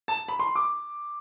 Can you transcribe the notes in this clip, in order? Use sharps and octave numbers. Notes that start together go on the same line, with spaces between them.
A5
B5
C6
D6